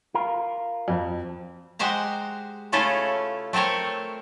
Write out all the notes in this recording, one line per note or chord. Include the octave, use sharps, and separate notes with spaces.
F4 A#4
F2
G#3 F#4 G4 C5 A#5
C#3 A3 C#4 E4 F4 A4
A3 C4 A4 A#4 C#5